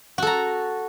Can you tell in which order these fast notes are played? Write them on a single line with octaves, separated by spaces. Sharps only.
F#4 A4 A#5